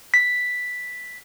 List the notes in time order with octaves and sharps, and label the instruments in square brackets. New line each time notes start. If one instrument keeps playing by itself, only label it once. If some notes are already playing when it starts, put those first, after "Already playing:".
[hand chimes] B6